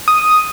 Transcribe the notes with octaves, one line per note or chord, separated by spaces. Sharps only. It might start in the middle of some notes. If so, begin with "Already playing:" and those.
D#6